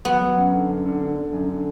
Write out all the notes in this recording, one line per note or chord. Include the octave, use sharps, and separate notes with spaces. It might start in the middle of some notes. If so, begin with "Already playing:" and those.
F#3 B3
F#3
F#2
D3
F#2
D3
D3
D3
F#2
D3